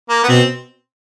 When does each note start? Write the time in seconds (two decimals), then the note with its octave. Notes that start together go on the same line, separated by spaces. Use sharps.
0.09 A#3
0.23 B3
0.28 B2 C4